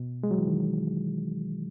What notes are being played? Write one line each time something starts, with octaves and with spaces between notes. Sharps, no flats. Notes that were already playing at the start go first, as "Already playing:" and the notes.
Already playing: B2
G#3
F#3
E3
D#3